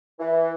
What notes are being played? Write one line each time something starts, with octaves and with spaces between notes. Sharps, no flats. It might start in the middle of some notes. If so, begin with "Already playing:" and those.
E3